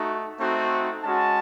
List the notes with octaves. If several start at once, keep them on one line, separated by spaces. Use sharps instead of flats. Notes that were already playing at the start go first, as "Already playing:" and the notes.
Already playing: A3 D#4 F#4
A3 C4 D#4 F#4
G#3 C#4 F#4 A5